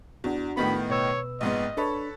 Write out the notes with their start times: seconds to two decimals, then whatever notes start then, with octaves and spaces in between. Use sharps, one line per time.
0.24 E2 D4 F#4
0.57 A2 D#3 B3 B5
0.90 B2 B4 C#5 E6
1.41 A#1 G#2 B3 D#5
1.77 D4 A4 B4 C#5 B5